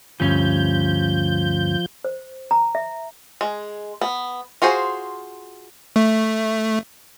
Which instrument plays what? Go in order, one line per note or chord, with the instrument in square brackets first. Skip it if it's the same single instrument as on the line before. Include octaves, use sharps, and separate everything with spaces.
[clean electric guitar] D2 G2 C#4 [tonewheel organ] F3 G6
[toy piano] C5
A#5
E5
[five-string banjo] G#3
B3
F4 F#4 G#4 C5
[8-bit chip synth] A3